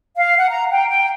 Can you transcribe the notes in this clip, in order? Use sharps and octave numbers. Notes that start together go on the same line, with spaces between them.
F5
F#5
A#5
G5
G5